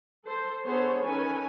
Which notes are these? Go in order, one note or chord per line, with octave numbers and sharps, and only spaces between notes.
A4 C5
D3 B3 G#4 A4 C5 C#5
D#3 C#4 A4 B4 G#5